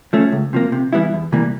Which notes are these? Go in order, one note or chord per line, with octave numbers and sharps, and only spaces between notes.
F3 A3 C#4
C#2
C3 F3 A#3
C3
E3 G3 B3 E4
E2
C3 E3 G3 A#3